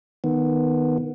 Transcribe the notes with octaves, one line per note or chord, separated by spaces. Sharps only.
D#3 B3